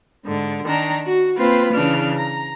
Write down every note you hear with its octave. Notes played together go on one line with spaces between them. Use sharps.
G#2 D3
D#3 D4 A#5
F#4
A#3 C4 F4 B4 C5
C#3 E3 D4 F6
A#5